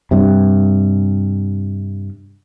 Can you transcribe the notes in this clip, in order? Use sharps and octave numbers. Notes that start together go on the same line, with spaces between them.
G2 C3